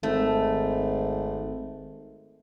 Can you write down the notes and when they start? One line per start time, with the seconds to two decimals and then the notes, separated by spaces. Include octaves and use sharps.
0.03 G#1 A3